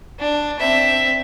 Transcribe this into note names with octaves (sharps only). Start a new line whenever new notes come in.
D4
C4 E5